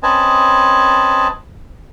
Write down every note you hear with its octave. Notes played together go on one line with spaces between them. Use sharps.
C4 C#4 B4 D#5 G#5 A5